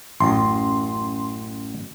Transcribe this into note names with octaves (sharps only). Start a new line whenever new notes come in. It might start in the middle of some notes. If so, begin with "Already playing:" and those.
A1 F#2 C6